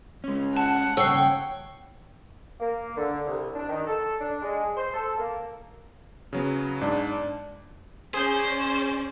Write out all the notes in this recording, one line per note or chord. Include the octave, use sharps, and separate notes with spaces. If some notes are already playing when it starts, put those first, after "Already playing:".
G#3 C#4
F#5 A5
G2 C#3 C#5 G5 E6 C7
A#3
D3
C2
D4
D#3
A4
D4
G#3
C5
A4
A#3
C#3 F#3 B3
G#2 D4
C#4 G#4 C5 D5 G6